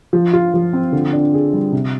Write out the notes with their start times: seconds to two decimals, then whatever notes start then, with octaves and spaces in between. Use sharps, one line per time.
0.13 F3
0.33 F4
0.54 F3
0.73 C4
0.93 D3
1.13 D4
1.34 G#4
1.53 G3
1.72 C3